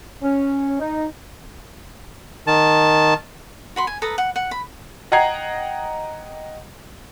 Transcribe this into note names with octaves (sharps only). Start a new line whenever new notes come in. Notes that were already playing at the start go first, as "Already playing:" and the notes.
C#4
D#4
D#3 A5
F#4 B5 C6
G#5
A4 B4 A#5 D#6
F#5
F#5
B5
D#5 F#5 G5 A#5 G#6 C7